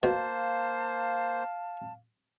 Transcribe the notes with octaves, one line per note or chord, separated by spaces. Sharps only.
B2 A#3 C5 F5 A5